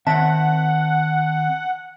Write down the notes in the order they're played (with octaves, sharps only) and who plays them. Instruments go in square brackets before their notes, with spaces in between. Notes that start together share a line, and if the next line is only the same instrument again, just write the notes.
[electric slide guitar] D#3 C4 E5 [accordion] F#5 [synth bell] A5